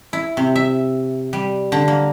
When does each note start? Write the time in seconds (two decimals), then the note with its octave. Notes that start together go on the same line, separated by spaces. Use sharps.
0.13 E4
0.37 C3
0.56 E5
1.33 G3
1.72 D3
1.88 A#3